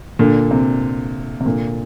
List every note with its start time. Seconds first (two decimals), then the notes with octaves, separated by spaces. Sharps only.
0.19 A#2 D3
0.51 C3
1.40 C3
1.45 A#2 D3